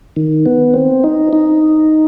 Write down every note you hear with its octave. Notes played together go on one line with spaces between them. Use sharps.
D#3
B3
C4
D#4
D#4